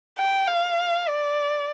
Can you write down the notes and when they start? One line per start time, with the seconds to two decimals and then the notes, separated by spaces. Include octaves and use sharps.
0.18 G5
0.48 F5
1.08 D5